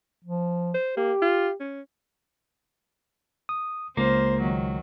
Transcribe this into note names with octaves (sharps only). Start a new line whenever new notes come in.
F3
C5
A#3 G4
F4
C#4
D#6
C#2 A#3 C5
D#3 F#3